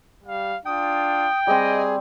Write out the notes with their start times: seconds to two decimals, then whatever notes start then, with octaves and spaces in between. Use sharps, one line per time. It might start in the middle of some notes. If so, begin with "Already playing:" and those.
0.24 G3 F5
0.66 D4 F4 G5 D#6
1.47 G3 C4 G#4 D#5